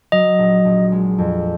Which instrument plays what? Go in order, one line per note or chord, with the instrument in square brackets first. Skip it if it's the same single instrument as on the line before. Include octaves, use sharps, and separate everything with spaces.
[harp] F#3 [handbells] D#5
[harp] A#1
A#1
G#3
F2